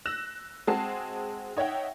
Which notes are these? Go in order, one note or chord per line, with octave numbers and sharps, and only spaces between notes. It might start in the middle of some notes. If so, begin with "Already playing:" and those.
E6 F#6 A#6 E7
G#3 C4 F#4 G#4 A5 C7
D#4 C#5 E5 F#5 G5